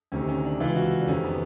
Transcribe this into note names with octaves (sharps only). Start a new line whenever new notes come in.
D2 C3 D#3 C#4
C#4
D4
C#2 C3 E3 F4
F#4
D4
F2 C3 D#3 C#4
B3